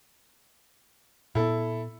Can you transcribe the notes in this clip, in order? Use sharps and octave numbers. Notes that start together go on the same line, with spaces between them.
A#2 B3 E4 A4